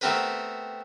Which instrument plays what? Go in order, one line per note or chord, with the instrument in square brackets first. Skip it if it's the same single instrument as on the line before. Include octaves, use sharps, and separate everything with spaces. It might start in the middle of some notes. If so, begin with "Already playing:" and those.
[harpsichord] A3 B3 C4 G4 A#4 B4